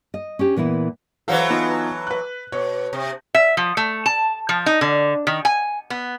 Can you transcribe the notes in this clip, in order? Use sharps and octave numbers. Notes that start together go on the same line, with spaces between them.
D#5
C#4 D4 G4
A#2 E3 B3 E4
E3 F#3 A4 C5 F5 F#5
B3 D#4 F4
B4 F#6
B2 C#5
C3
E5
F3
A3
A5
F3
D#4
D3
D#3
G#5
B3